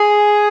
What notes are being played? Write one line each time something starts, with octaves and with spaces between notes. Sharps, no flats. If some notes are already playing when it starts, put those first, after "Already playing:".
Already playing: G#4